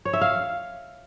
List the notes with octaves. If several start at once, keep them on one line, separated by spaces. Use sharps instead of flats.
C#5
E5
F5